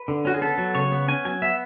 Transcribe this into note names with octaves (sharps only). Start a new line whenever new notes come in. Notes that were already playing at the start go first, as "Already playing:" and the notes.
Already playing: B4
D3
C#4 F#4
G#4
B3 A4
F#3
C#3 C#5
B3
C#4 G#5
F#3 G#5
B3 E5